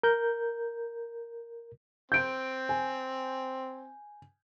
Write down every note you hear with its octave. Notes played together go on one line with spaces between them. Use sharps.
A#4 G6
C4 G6 D7
G#5